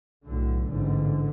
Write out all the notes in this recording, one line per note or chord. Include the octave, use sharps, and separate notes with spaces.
B1 A2 D3
A1 G#2 D3